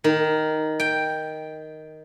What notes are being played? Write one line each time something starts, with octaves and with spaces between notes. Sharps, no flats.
D#3
G5